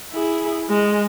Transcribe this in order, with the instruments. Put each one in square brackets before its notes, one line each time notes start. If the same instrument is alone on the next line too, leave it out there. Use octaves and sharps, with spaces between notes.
[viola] E4 G#4
G#3